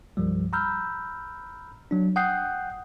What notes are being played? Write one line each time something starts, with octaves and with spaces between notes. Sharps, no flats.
C2 G2 F3 G3
A#5 B5 E6 F6 G6
F#3 D4
F#5 G5 D#6 F#6 G6 C7